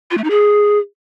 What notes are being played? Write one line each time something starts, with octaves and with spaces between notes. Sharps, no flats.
F4
A3
D#4
G#4